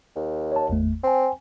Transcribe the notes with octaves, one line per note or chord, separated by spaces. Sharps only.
D#2
C#5 A5
G#1 E2 A3
C4 G5 G#5